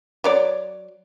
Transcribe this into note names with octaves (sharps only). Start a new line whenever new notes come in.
F#3 C#5 D5